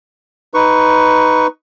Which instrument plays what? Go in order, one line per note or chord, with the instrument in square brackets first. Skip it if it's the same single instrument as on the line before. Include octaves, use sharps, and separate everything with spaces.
[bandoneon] D#4 B4 C#6